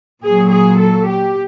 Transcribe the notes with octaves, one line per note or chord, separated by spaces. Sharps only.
A#2 F#3 G#4
G#4
A4
G4